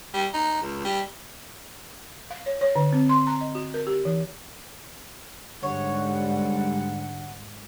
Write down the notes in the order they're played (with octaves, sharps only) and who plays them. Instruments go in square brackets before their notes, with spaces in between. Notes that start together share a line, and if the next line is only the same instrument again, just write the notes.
[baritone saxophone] G3
D#4
C#2
G3
[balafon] F5
C#5
C#5
D3
C4
C6
A#5
D#5
F#4
A#4
G4
E3
[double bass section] G#2 G3 [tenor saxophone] D3 [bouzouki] C#5 [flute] F#5